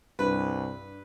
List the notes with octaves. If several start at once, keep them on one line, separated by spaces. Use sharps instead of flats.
C2 G2 B4